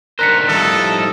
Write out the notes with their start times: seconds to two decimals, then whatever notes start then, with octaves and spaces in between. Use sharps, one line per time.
0.19 D#3 D4 A#4 C5 F#6 B6 C#7
0.48 A2 F3 G3 D#4 A4